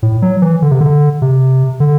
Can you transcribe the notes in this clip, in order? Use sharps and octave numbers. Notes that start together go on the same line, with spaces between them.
A2
F#3
E3
D3
C3
D3
C3
D3